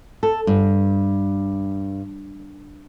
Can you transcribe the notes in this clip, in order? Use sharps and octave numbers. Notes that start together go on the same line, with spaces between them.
A4
G2